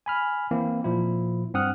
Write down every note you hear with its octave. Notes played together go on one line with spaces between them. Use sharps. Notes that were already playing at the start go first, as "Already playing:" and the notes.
G#5 B5 F6
E3 A#3 C4 E4
A#2 F3 E4
G2 C4 F#5 D#6 F6 F#6